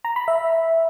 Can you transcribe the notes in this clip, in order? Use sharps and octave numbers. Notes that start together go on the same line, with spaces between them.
A#5
B5
E5